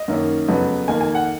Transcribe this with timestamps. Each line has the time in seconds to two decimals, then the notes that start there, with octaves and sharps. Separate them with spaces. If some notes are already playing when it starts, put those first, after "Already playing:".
Already playing: D#5
0.08 F#2 D#3 A#3 C#4
0.48 F2 C#3 F#3 B3
0.88 F2 D#3 A#3 G#5
1.01 G#5
1.15 F#5